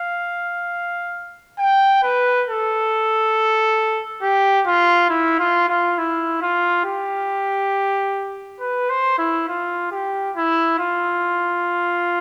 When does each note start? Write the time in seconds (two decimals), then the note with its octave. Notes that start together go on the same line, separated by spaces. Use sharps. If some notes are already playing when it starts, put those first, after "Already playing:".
Already playing: F5
1.59 G5
2.03 B4
2.48 A4
4.22 G4
4.66 F4
5.10 E4
5.40 F4
5.68 F4
5.98 E4
6.42 F4
6.85 G4
8.60 B4
8.90 C5
9.18 E4
9.48 F4
9.91 G4
10.36 E4
10.79 F4